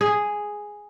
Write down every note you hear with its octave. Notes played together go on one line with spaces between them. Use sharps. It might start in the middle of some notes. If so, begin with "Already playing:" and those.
G#4